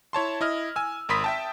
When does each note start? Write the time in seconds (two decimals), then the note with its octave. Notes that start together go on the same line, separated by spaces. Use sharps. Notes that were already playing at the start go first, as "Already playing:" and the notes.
0.13 E4 C#5 A5 C6
0.41 E4 D#5 F6
0.76 G#5 E6
1.09 G#1 A#4 B5 C6 D#6 B6
1.24 E5 G5 A5